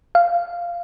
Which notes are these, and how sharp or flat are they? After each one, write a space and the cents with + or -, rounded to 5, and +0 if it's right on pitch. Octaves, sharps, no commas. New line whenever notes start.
F5 -10